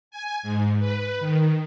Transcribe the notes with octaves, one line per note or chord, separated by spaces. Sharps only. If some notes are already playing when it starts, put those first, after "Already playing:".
G#5
G#2
B4
D#3